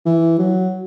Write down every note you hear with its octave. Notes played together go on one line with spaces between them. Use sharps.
E3
F#3